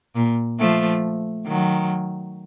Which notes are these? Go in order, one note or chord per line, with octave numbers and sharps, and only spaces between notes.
A#2
F3 A3
D#3 F#3